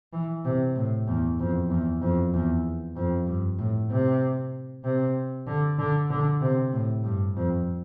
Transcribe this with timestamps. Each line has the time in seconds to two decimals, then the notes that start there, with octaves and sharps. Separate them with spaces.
0.13 E3
0.45 C3
0.76 A2
1.08 E2
1.39 F2
1.70 E2
2.01 F2
2.34 E2
2.96 F2
3.27 G2
3.59 A2
3.90 C3
4.84 C3
5.47 D3
5.79 D3
6.10 D3
6.42 C3
6.73 A2
7.04 G2
7.36 F2